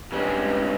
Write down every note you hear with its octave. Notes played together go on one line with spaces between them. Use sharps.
G2 C3 E3 G#3 C#4